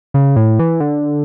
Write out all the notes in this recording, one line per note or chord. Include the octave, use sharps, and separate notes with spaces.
C#3
A2
E3
D3